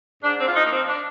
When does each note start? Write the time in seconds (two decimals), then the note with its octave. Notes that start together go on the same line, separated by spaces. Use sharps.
0.23 G#2 D4
0.40 C4
0.48 F4
0.56 F3 D#4
0.66 A#3
0.71 C4
0.88 D4